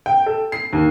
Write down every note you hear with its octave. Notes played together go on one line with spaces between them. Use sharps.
G5
A4
C7
D#2